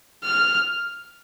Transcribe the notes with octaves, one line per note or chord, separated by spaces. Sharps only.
F6